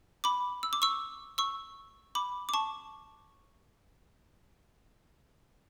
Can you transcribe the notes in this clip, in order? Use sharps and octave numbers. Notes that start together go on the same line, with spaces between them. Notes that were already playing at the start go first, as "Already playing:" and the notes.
B5 D6
E6
D6
C#6 E6
C#6 E6
B5 D6
D6
A5 C#6